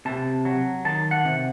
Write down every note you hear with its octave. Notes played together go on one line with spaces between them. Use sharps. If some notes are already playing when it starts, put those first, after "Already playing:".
C3 A5
F#3
D#3 A5
F#5
C3